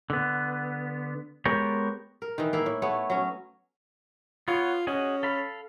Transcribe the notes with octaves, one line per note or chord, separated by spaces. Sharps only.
D3 B3
G#3 B3 G4 A#4 C#5
A#4
D#3 E3
A#3 E4
A2
A3 B3 C#5
F#3 C#4
B3 F4 C#5
C#4 F#4 G#4 D#5
A4 F5 B5